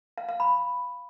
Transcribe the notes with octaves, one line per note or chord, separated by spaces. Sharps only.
F5
F5
B5